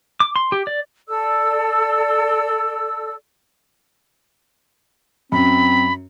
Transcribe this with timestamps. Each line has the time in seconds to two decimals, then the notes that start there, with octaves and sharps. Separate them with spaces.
0.20 D6
0.36 C6
0.52 G4
0.67 D5
1.08 A4 D5 E6
5.32 F#2 C4 B5